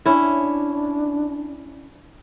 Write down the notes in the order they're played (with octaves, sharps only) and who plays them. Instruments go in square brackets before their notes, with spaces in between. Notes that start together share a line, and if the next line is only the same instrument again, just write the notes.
[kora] C#4 E4 [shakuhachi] D4